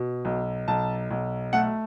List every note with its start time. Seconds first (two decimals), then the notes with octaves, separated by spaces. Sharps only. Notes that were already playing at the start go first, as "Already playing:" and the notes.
Already playing: B2
0.25 B1
0.68 B1 A5
1.11 B1
1.53 A3 F#5